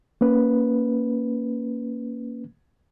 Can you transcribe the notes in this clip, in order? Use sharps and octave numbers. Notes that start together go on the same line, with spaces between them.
A#3 C#4 B4